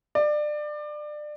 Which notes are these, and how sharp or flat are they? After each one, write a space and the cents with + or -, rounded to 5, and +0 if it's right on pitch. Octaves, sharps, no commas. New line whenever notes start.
D5 +25